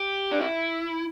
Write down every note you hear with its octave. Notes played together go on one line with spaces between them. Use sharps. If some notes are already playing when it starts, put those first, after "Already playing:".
Already playing: G4
D4
E4